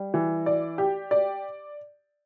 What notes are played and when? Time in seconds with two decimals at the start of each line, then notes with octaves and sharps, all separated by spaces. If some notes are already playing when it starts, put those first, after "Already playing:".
Already playing: G3
0.14 E3
0.46 D5
0.78 G4
1.11 D5